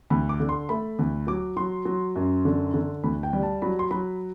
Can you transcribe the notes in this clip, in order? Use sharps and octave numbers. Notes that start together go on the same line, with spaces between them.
D2 B5
D6
D3
C6
A3 B5
D2
F#3 D6
F#3 C6
F#3
F#2
D3
D3
D2 B5
G5
G3
A5
F#3 B5
C6
F#3 B5